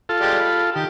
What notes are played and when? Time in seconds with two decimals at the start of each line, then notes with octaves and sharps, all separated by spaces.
0.09 F4 A4
0.21 G#3 G4 D5
0.40 B5
0.76 D#3 G4